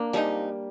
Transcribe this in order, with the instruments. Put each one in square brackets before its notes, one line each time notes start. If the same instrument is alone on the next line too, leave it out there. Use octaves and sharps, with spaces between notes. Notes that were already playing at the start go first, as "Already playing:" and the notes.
Already playing: [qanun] A#3 D4
[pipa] C3 F3 G#3 D#4 [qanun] G3